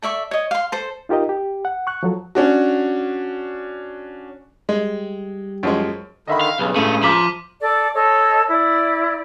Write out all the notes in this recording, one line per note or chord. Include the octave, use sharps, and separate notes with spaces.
A4 D5 E5 C#6
C#5 D#5
F5 C6
A4 C5
D#4 F4 G4 A#4 D#5
G4
F#5
C#6 F#6
F3 F#3 A4
C#4 D4 F#4
G3 G#3
F#2 F3 G#3
D3 D#3 D#5 E5 B5
F5
B1 G2 C#3 B4
C#2 A2 A3 D#7
F3 A#5 D6 F6 B6 F#7
A4 D5 D6
A4 C#5 D#5
E4 D5